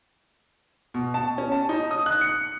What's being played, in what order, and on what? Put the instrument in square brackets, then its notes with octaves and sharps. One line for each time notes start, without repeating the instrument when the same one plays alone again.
[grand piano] B2
A5
C#4
A5
D#4
D#6
F#6
C#7